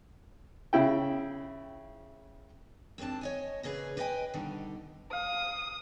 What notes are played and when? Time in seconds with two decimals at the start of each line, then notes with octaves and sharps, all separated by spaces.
0.73 C#3 E4 G5
2.98 D#2 G#2 C4 D4 A5
3.21 C#5 D#5 G#5
3.63 A#2 C#3 C#4 G#4 B4
3.97 B4 D5 D#5 F5 G5 G#5
4.34 B2 D3 D#3 G3
5.13 F5 D#6